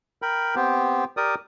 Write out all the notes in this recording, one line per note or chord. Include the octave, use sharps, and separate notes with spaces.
A#4 G5 B5
B3 C4 G4
G4 A#4 D5 D#6